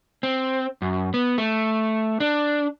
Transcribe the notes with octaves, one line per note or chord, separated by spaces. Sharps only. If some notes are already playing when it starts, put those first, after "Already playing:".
C4
F#2
B3
A3
D4